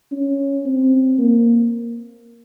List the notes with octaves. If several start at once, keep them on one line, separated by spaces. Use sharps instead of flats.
C#4
C4
A#3